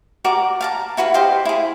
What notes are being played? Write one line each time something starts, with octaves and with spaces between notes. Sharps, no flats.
F#4 A#4 D5 D6
F5 A5 A#5
E4 F#4 B4 F5
G4 C5 D#5 F5
E4 G#4